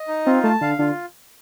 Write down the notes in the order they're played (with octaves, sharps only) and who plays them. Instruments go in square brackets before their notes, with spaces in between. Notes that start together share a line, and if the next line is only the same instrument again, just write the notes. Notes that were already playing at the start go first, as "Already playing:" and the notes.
Already playing: [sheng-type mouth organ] D#5
D#4
[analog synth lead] C4 [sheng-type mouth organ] F4
[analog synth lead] A3 [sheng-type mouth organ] A5
[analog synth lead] D3 [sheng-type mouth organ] F5
[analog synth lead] D3 [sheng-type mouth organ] F4